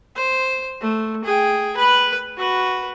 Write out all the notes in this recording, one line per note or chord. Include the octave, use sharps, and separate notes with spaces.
C5
A3
G#4 G5
B4 B5
F#4 B4